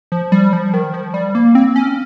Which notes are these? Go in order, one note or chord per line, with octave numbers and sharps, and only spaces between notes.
F3
G3
F3
D#3
F3
G3
A#3
C4
C#4